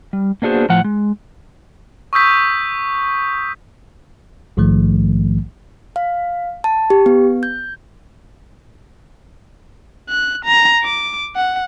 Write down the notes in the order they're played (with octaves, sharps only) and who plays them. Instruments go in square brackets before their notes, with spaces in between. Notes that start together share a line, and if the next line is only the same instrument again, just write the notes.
[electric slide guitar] G3
A#3 B3 D4 F#4 G#4 C5
A2 F3 F#5
G#3
[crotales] C#6 D#6 E6 G6 B6
[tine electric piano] A#1 G#2 D#3 F3 A3
[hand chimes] F5
A5
G4
B3
G6
[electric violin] F#6
A#5
D6
F#5